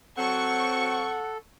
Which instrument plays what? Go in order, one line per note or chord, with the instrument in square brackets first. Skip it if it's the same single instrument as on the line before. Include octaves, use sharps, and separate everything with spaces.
[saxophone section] F#3 C4 [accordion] A4 [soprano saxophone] F#5 [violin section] C#6